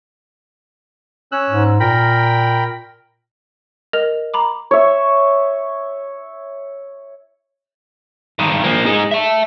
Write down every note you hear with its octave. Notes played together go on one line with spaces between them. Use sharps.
C#4 E6 F#6
G#2
A#2 A#4 G5 B5
A#4 D#5 F6 F7
A#5 B5 D6
C#5 E5
G2 D#3
F3 A#3
G#3 D#4
E5 A5